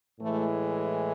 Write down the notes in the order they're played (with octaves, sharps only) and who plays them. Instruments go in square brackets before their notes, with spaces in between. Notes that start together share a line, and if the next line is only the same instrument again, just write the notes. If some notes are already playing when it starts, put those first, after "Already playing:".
[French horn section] A2 E3 G#3 A3